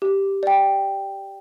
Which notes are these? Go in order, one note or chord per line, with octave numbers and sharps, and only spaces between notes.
G4
D5 G5